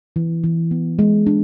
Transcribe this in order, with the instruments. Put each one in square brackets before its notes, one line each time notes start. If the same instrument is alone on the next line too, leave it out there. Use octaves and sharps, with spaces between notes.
[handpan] E3
E3
B3
G#3
D4